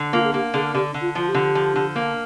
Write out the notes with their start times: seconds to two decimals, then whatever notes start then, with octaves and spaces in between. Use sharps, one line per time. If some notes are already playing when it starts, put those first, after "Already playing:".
Already playing: D3
0.13 A#3 F4
0.24 G#4
0.34 A#3 G4
0.54 D3 G#4
0.74 D3 G4
0.94 D3
1.01 F4
1.15 F3 F4
1.29 G4
1.34 D3
1.55 F3
1.75 D3
1.96 A#3